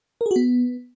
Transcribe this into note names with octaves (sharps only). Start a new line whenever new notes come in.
A#4
G#4
F#4
B3